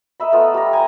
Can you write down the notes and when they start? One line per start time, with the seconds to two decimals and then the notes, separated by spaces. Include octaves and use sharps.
0.20 A#4 D#5 E5 B5
0.32 A3 B3 F4
0.54 G3 A#4
0.72 G5 G#5 A#5